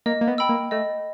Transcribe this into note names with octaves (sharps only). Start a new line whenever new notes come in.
A#3 D#5
A#3
B3
G5 B5 E6
A#3
A3 D#5